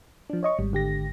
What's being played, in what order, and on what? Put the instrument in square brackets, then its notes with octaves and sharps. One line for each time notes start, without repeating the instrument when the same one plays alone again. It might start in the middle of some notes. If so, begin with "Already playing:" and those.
[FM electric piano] F3 D4
C#5 D#5 C#6
[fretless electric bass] G#1 [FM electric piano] G3
[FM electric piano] D3 G4 A#6